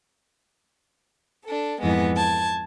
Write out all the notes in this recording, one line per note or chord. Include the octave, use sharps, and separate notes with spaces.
D4 A4
F2 G#2 E3 G#3 B3
A5 G#6